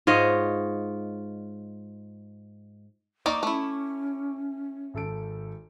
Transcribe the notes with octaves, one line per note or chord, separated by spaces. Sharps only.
G#2 F4 C#5 D#5
A#3 D#4 D5 C#6 D6
A3 C#4 E4
G#1 A4 D7